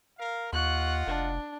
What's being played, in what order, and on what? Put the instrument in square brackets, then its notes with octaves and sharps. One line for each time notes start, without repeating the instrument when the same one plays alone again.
[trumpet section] A#4 F5
[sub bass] D#2 [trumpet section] F4 D#5 F#5 [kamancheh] C#6 F#6
[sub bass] F1 [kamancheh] D4